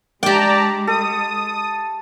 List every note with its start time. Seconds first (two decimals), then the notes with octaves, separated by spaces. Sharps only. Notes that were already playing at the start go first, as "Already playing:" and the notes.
0.23 G#3 G4 D5 G5 A5 A#5
0.87 A4 D#6